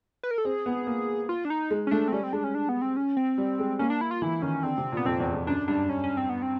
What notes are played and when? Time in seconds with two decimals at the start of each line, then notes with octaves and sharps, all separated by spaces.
0.23 B4
0.31 A#4
0.38 A4
0.45 C4 G#4
0.66 B3
0.87 A#3
1.29 F4
1.45 D4
1.50 D#4
1.71 G#3
1.87 C#4
1.91 A3 D4
2.08 C4
2.12 G3 C#4
2.23 C4
2.33 G#3 D4
2.44 C#4
2.55 D4
2.69 B3
2.82 C4
2.97 C#4
3.17 C4
3.38 G3
3.59 G#3
3.79 A#3 C#4
3.90 D4
4.01 E4
4.11 F4
4.22 E3 E4
4.42 D#3 C#4
4.63 D3 C4
4.78 C3
4.92 A#2
4.97 B3
5.05 F2 C4
5.20 E2
5.34 F2
5.47 F#2 D4
5.68 G2 D4
5.89 C#4
6.04 C#4
6.17 C4
6.29 B3
6.42 C4